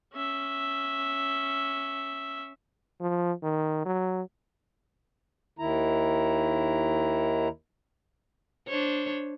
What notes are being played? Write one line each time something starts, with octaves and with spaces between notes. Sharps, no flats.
C#4 E5
F3
D#3
F#3
D#2 D#3 E4 A#5
D4 C5 C#5